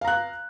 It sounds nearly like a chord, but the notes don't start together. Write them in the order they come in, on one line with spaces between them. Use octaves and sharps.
F5 A#5 F#6